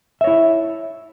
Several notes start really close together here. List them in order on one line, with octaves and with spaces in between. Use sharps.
E5 C#5 E4